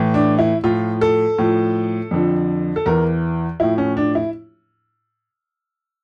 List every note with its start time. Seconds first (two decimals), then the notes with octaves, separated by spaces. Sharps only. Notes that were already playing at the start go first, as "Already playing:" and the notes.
Already playing: A2 E3
0.14 D4
0.39 E4
0.64 A2 F3 F4
1.01 A4
1.38 A2 F3
2.11 F2 D3 F3
2.76 A4
2.86 E2 E3 A#4
3.60 A2 F3 E4
3.78 C#4
3.97 D4
4.15 E4